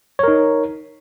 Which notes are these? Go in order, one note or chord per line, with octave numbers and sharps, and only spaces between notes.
D#4 A#4 C#5